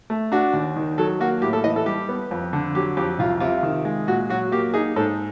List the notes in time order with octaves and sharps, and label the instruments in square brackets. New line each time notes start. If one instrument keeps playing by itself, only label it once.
[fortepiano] A3
D4 F#4
D#2
D#3
F#3 A4
A#3 F#4
A2 G4
A4
E3 D#5
A4
G3 G4
B3
F2
D3
F#3 G4
F2 G4
C2 F4
C3 F4
D#3
G#3
A#2 F#4
F#3 F#4
A#3 G4
D#4 G#4
G#2 A4